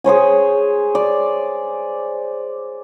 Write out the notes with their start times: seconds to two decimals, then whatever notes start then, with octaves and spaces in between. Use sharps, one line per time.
0.04 G#4 C5 C#5 G#5
0.95 D5